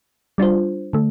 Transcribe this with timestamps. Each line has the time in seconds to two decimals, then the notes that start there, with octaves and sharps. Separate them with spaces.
0.38 G3 D4 F4 C5
0.93 D3 A3